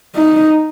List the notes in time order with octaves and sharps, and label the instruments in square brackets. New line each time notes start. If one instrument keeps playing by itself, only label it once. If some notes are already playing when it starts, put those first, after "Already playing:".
[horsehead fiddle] D#4